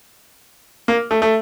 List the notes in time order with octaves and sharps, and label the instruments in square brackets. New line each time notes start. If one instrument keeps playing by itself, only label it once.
[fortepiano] A#3
A3
A3